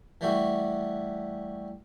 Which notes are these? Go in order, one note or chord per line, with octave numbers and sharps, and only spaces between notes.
E3 G3 A3 F#4